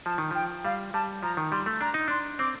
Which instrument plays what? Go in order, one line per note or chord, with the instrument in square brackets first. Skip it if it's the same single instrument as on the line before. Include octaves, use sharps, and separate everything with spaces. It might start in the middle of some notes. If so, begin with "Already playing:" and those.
[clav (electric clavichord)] F3 [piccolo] A5
[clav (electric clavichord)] D#3
[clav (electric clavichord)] F3 [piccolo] G5
[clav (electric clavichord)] G3 [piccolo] F5
[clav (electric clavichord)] G3 [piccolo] A5
[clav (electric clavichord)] F3 [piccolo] A#5
[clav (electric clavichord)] D#3
[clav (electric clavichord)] G3 [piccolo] C6
[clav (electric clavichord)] A3
[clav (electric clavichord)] D4 [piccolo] A#5
[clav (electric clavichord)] D#4
[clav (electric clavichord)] D4 [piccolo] C6
[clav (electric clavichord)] C4 [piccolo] D6